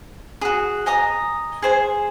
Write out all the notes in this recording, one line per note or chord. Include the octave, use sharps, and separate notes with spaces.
F#4 G#4
D#5 G#5 A#5 D#6
G#4 C5 G#5